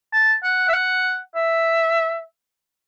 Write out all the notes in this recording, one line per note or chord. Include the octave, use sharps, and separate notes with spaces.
A5
F#5
E5
F#5
E5